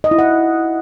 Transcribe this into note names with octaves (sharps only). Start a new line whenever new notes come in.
D#5
E4
F#5